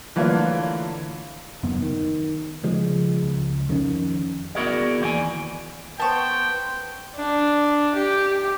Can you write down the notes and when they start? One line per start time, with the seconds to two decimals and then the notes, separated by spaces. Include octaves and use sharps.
0.16 D3 E3 A3 A#3 F4 C#5
1.63 F1 F#2 D#3 B3
1.82 D#3
2.63 C#3 F3 G#3
3.23 C#2
3.69 F2 D#3 C4 C#4
4.55 B3 E4 F#4 G#4 A#4 D5
5.01 D#2 E3 C5 D5 G#5
6.00 B3 C5 G5 A5 C#6
7.16 D4
7.96 G4